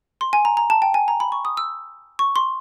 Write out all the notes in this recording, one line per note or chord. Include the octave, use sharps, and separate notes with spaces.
C6
G#5
A#5
A#5
A5
G5
G#5
A#5
B5
C#6
D#6
E6
C#6
C6